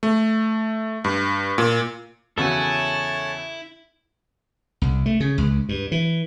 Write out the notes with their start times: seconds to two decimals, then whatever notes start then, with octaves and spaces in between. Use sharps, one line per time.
0.03 A3
1.04 G2
1.58 A#2
2.38 E2 C#3 E4 F#4 A4 C#5 G#5 A5
4.82 C2
5.06 A3
5.20 C#3
5.38 C#2
5.69 G2
5.92 E3